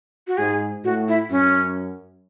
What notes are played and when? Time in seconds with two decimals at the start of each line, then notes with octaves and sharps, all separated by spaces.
0.27 F#4
0.38 G#2 G#4
0.84 A2 F#4
1.08 E4
1.30 F#2 C#4